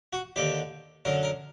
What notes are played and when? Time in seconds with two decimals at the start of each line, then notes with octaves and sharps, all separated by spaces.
0.13 F#4
0.36 D#2 D3 G4
1.05 F#2 D3 A#4
1.23 A#4